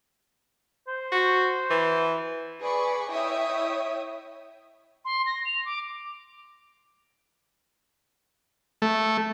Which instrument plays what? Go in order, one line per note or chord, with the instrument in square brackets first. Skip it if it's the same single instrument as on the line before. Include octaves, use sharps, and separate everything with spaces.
[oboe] C5
[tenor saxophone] F#4
E3
[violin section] G#4 B4 D5 B5 C#6
E4 C#5 D#5 E5 G5 D#6
[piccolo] C6
A#6
F7
D6
[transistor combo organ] A3